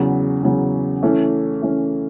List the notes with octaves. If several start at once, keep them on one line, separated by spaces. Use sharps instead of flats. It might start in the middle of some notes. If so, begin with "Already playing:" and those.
Already playing: E2 C#3 F#3
E2 C#3 F#3
E3 A3 C#4
E3 A3 C#4